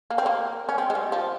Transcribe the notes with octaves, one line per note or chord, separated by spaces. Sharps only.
A#3
C4
A#3
C#4
C4
G#3
G3
F3